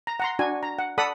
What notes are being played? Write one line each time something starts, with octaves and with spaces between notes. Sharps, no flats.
A#5
F#5 A#5 C6
D4 F#4 G#5
A#5
F#5
A4 D5 F#5 B5 D#6